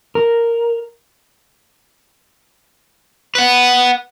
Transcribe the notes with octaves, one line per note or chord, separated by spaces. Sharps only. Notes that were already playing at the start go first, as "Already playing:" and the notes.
A#4
B4 F#5